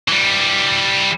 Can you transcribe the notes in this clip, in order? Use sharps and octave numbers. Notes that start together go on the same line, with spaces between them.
E3 G3